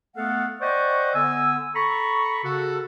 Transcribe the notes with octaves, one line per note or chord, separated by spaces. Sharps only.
A3 B3 A4 F5 F#5
C5 D5 D#5 F#5 G5 C#6
D3 B3 G#5 E6
A4 A#5 B5 C#6
C#3 F#4 A4